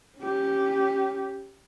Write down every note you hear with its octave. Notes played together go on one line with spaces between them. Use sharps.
C#4 G4